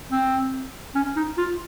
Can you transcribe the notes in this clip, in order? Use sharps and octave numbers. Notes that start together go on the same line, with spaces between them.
C4
C#4
D#4
F4